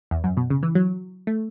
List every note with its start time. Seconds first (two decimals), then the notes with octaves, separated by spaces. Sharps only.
0.11 E2
0.24 F#2
0.37 B2
0.50 C#3
0.63 E3
0.75 F#3
1.27 A3